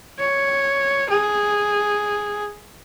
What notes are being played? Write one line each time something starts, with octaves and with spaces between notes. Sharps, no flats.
C#5
G#4